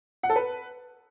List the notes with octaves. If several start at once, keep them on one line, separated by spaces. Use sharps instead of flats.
F#5
A4
B4